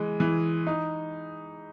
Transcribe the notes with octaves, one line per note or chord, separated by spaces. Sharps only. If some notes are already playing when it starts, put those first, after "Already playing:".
Already playing: E3 G#3
E3
D#4